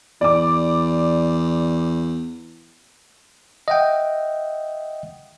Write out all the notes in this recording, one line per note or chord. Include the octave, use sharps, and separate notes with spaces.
E2 D5 D6
D#5 E5 F#5 G5